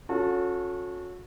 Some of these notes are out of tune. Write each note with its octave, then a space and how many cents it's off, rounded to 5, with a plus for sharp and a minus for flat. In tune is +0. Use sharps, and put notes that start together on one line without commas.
C#4 +0 F#4 -35 A4 +0